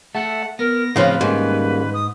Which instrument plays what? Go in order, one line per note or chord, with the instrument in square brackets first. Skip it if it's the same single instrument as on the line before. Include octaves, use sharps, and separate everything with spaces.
[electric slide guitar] A3 A4 [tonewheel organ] E5 A5 [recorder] F#5
[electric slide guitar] B3 [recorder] A#4 [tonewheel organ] A#6
[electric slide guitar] A2 C4 [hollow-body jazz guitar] C#3 F3 F4 [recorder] B4
[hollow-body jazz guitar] G#2 [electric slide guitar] D#3 G#3 C#4 [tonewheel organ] G3 A#3
[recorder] D#6